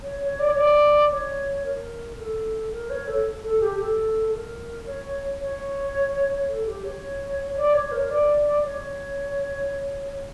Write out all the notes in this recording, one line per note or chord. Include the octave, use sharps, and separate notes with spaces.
C#5
C#5
D5
C#5
D5
C#5
A#4
A4
A#4
C#5
A4
A4
G4
A4
A#4
C#5
C#5
A4
G4
C#5
D5
C#5
A#4
D5
C#5